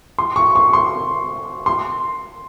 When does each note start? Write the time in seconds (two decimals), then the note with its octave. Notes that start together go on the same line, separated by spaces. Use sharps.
0.19 C6
0.36 C#6
0.56 C#6
0.73 C6
1.66 C6